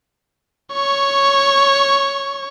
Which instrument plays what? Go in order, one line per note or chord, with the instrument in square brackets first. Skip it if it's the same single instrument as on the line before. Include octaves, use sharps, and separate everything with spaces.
[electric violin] C#5 C#6